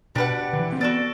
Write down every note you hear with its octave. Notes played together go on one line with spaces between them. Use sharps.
B2 D4 G4 B4 F#5
D3
E3
C4
B3 F#4 A4 D5